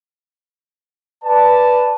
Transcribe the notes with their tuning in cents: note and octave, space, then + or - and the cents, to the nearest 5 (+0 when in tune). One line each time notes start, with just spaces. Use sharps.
B4 +0 D5 +0 A5 +0